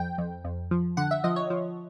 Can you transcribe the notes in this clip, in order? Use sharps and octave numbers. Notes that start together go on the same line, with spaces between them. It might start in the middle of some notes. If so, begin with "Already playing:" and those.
Already playing: F2 G5
F2
F2
F3
D3 F#5
E5
F3 D#5
C#5
F3